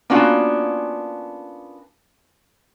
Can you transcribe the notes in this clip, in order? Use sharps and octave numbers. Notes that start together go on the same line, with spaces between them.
A#3 B3 C#4 D4 F4 F#4